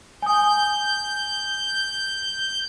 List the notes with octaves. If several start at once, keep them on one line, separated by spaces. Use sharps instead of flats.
G#5 D#6 G6